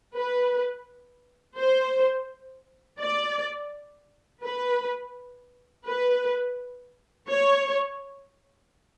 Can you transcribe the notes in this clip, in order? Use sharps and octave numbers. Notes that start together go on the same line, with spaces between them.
B4
C5
D5
B4
B4
C#5